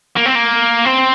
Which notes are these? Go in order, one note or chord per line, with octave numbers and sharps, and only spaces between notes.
A#3
C4
A#3
C4